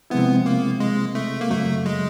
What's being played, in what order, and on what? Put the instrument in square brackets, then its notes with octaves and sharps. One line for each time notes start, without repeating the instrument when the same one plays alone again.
[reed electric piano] C3 F3 G#3 C4 E4 [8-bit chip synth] B3
[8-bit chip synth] A#3
G#3
A3
A#3
[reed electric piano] F#2 C#3 F#3 [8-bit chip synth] A3
[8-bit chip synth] G#3